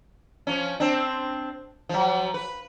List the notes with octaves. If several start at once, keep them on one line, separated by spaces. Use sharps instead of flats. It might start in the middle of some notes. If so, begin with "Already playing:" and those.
F3 C#4
C4 D4
F3 F#3
B4